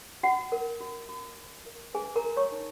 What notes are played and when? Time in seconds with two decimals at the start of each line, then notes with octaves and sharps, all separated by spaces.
0.23 F#4 F#5
0.52 A#4
0.81 F#4
1.09 F#4
1.37 F#4
1.66 A#4
1.94 G#4 B4 G#5
2.16 A#4 A#5
2.23 F#4
2.37 C#5 C#6
2.51 D#4